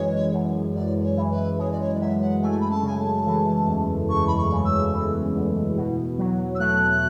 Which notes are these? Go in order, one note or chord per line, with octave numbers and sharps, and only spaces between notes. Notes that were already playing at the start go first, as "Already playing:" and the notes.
Already playing: F#2 E3 G#3 C#5
F#2
F#2 D5
C#5
E3
B4
G#3 C#5
D5
C#5
D5
F#2 E5
F#5
A3 G#5
B5
A5
C#3 G#5
A5
E3
E2
A3 C#6
B5
C#6
C#3
E6
E3
E2
B2
F#3
E6
A3 F#6